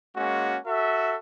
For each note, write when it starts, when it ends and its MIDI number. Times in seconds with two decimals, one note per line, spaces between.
0.17 0.57 56
0.17 0.57 58
0.17 0.57 61
0.17 0.57 66
0.67 1.16 66
0.67 1.16 69
0.67 1.16 76